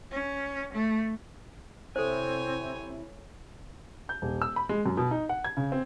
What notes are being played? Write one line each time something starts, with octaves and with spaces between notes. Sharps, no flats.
C#4
A3
C3 C4 E4 A4 C5 C#5 G#5
G6
D#1
E6
B5
G#3
F#2
B2
D#4
F#5
G#6
C#3
C4